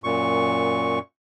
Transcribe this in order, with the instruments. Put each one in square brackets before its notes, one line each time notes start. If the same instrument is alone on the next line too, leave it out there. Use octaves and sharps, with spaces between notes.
[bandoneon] F#2 A#2 C#6